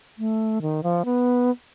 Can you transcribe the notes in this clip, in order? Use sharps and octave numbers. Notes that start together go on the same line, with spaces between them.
A3
D#3
F3
B3